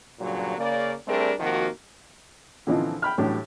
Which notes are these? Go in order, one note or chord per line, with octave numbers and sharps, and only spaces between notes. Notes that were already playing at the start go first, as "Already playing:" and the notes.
G2 A#2 C#3 F#3
C#3 A#3 D5
G3 A3 C4 D4 G#4 A#4
C3 D#3 F3 A#3 F#4
A#2 D3 E3 F3 C4 D#4
G5 B5 F6
A2 E3 F#3 G3 D4 G4